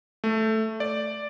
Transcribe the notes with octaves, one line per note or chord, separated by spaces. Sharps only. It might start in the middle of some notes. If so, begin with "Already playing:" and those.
A3
D5